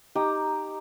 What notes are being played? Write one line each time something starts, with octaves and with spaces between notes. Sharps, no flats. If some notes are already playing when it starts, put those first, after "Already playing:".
D#4 G4 D#6